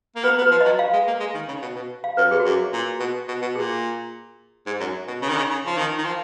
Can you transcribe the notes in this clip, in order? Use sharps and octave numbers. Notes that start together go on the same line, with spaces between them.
A#3
B3 B4
B3
B4
F3
F#3 D#5
F5
G#3
A#3
G#3
D#3
C#3
B2
B2
F5
F#2 B4
F2 G#4
F#4
F#2 G#4
A#2
B2
B2
B2
A#2 G#4
G#2
F#2
B2
C#3
D#3
C#3
C#3
F3
D#3
D#3
F3